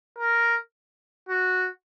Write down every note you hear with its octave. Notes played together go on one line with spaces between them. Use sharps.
A#4
F#4